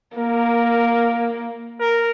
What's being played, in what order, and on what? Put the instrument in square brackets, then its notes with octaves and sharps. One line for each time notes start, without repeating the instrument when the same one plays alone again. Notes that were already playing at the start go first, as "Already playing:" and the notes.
[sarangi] A#3 [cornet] A#4
[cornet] A#4